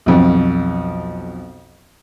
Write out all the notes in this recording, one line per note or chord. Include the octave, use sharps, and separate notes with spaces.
B1 F2